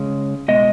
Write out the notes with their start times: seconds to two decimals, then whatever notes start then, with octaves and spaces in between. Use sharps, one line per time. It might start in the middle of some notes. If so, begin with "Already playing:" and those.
Already playing: C#3 G#3 C#4
0.48 B2 G#3 D#5